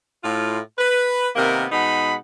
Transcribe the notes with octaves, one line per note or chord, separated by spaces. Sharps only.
A2 F4
B4
C3 D#3 A#3 B3 A#4
B2 G#3 D#4 F#5 B5